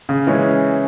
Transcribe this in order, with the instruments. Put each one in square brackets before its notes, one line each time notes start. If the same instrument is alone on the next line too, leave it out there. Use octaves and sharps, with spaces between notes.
[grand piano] C#3
E3 G#3 C#4